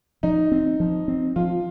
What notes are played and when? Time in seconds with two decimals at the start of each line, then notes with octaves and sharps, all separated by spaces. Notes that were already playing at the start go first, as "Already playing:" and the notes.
0.23 F3 D#4
0.52 C4
0.80 F3
1.08 C4
1.36 F3 F4